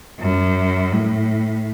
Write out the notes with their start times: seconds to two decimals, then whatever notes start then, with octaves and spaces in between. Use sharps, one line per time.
0.20 F#2
0.93 A2